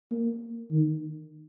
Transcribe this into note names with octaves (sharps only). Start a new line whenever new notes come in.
A#3
D#3